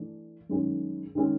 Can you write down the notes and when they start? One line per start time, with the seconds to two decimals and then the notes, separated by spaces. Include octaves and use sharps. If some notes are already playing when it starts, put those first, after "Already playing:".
Already playing: E3 A3 D4
0.49 F#2 D#3 G#3 C#4
1.15 D#3 G#3 C#4